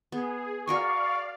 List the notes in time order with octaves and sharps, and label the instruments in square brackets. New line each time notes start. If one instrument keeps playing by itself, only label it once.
[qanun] B3 [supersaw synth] G#4
[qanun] F#4 A#4 G#5 [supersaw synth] D5 F5 [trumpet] C#6